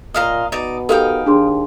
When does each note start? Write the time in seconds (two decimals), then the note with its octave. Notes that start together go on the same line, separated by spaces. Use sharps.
0.14 A#2 D#5 F5 A#5
0.52 B2 D#4 D5
0.89 D#4 G4 A4 A#4 F5 G5
1.26 D#2 D4 G#4 C6